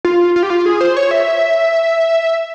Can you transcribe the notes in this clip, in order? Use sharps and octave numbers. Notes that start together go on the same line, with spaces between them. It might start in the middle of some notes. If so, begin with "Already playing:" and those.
F4
F4
G4
F4
G#4
C5
C#5
E5